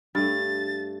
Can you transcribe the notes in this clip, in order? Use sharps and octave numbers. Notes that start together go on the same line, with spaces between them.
G2 A3 A6